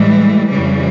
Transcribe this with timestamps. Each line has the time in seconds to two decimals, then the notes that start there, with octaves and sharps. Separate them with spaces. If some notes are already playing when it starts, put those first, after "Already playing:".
Already playing: A2 E3 G3 G#3
0.50 F2 C#3 E3 G3